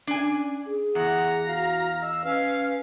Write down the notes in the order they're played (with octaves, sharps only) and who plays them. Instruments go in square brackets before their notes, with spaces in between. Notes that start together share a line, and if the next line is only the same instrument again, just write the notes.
[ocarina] C#4 [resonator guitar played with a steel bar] D4 G#5
[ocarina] G#4
[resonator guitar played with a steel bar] E2 [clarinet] F#5 [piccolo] A#5
[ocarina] F#4 [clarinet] F5
[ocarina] D#5 [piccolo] E6
[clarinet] C#4 [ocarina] B4 [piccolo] F5